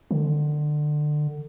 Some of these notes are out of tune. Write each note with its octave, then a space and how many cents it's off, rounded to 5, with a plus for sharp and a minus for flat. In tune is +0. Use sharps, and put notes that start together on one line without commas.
D3 +25